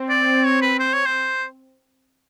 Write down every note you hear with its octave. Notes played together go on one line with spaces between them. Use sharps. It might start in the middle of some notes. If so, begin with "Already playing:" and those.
Already playing: C4
D5
C#5
B4
C5
C#5
C5